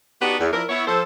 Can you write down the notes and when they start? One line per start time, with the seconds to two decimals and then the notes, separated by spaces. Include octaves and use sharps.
0.21 B3 D4 D#4 F#4 G4 B4
0.40 E2
0.53 F3 D4 E4 A#4
0.69 B3 E4 C#5
0.87 F3 A4 C5